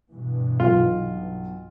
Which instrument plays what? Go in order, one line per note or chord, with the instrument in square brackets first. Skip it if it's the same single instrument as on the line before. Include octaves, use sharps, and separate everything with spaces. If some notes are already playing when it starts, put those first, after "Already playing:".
[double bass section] G2 B2 E3
[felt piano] B1 [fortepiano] F4